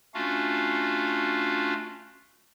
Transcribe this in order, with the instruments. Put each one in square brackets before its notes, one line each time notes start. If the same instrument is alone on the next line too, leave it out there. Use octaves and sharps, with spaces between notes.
[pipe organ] A3 C#4 D4 F4 F#4 F5